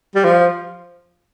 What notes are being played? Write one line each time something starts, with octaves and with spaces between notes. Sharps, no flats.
G3
F3